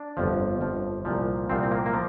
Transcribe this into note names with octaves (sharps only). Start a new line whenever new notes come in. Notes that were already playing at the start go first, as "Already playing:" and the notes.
Already playing: D4
G1 F2 F3
G1 F2 F3
C2 A#2 F3
C2 A#2 F3 C4
C4
A#3
A#3
F3